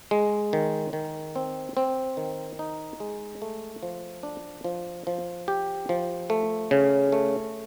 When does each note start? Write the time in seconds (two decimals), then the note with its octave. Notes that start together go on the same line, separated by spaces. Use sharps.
0.11 G#3
0.53 D#3
0.93 D#3
1.36 C4
1.77 C4
2.17 D#3
2.59 D#4
3.00 G#3
3.42 A3
3.83 F3
4.23 D4
4.64 F3
5.07 F3
5.48 G4
5.89 F3
6.30 A3
6.71 C#3
7.12 A3